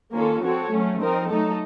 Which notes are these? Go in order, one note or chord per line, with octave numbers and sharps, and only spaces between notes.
D#3 A#3 C#4 F4 A4
F3 C4 F#4 A4 C#5
F#3 A3 C#4
F3 C4 D#4 A#4
F#3 A3 D#4 A4